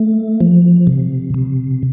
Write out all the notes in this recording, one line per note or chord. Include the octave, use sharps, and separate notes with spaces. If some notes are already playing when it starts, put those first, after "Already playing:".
Already playing: A3
F3
C3
C3